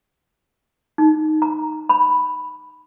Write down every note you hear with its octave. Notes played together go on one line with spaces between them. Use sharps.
D#4
A#5
B5